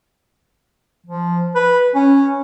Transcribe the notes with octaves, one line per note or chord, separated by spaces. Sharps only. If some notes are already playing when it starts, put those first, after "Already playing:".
F3
B4
C#4